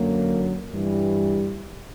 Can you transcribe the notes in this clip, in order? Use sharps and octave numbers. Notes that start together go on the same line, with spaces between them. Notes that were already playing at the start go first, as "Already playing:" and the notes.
Already playing: F#2 D3 F#3 A#3
G2 E3 G3